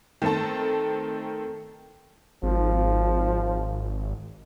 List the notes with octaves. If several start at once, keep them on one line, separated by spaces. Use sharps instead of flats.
D#3 A3 C4 A4 A5
G#1 F3